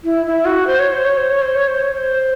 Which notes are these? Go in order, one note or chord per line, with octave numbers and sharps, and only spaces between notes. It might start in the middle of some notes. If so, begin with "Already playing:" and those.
E4
E4
F#4
C5
C#5
C5
C#5
C5
C#5
C5
C#5
C5
C#5
C#5
C5